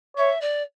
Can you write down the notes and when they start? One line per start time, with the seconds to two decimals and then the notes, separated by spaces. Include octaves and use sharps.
0.17 C#5 E5
0.41 D5